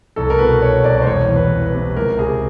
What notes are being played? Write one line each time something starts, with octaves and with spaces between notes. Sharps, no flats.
C2 A4
A#4
B2 B4
B2 C#5
C2 D5
C5
E1 C#5
E2
B4
E1
B4
C3
C#2 A#4
C3 G#4